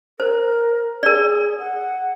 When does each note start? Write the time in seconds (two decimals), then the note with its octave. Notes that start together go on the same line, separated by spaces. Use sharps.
0.20 A#4 C5
1.03 G#4 A#4 D5
1.59 F#5